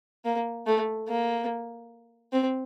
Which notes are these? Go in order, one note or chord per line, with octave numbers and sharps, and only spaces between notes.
A#3
A3
A#3
C4